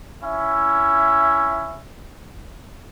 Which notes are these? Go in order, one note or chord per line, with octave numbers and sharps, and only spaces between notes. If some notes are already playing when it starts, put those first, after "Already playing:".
C#4 E4 E5